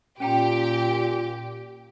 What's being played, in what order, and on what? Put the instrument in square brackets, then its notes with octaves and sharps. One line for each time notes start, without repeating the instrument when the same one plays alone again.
[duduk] A#2 [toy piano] C#4 G5 A#5 [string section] G4